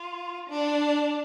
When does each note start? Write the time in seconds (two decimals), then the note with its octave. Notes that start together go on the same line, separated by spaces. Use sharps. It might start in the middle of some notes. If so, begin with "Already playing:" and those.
Already playing: F4
0.49 D4